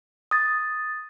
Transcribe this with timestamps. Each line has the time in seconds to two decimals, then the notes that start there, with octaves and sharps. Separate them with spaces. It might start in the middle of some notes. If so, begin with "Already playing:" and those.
0.31 D#6 A6